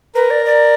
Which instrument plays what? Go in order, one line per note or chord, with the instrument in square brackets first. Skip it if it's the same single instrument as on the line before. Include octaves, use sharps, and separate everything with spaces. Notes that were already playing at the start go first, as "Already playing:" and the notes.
[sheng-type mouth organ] A#4 [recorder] B4
[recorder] D5
D5